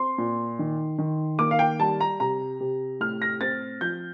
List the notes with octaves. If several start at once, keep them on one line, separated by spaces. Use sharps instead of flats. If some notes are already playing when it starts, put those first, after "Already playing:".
Already playing: C4 C6
A#2
D#3
D#3
A#3 D6
F5
G5
G3 A5
A#5
C3 A#5
C3
A2 F6
A#6
C4 A6
F3 G6